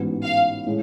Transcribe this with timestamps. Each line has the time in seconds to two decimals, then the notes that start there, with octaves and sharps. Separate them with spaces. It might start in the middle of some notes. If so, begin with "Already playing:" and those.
Already playing: A1 G#2 G#3 B3 F#4
0.24 F5
0.67 A2 G#3